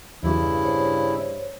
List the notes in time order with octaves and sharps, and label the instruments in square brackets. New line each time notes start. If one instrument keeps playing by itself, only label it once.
[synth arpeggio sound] E2 F#3 [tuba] G2 [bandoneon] C#3 E4
[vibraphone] C5 C#5